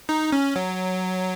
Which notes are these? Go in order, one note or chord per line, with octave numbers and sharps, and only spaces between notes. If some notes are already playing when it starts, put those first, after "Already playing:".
D#4
C#4
F#3